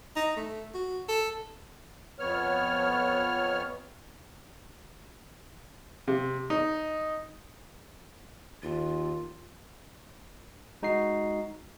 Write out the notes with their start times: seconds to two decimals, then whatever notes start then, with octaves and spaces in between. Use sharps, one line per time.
0.16 D#4
0.37 A3
0.74 F#4
1.09 A4
2.19 F2 B3 C#5 F6
6.08 C3
6.50 D#4
8.63 D#2 F4
10.82 G#3 D#4 F#4 D#5 C7